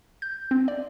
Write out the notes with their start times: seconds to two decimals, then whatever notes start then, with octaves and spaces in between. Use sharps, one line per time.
0.22 G6
0.51 C4
0.68 D5